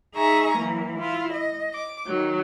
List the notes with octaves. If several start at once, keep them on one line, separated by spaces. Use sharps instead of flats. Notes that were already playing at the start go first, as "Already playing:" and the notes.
D#4 G#4 E5 G#5 A#5 C#6
E3 F#3 A#3
E4 F4
D#5
D6
D#3 F#3